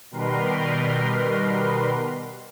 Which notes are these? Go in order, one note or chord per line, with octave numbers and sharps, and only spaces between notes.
B2 D#3 G3 A#4 B4 C6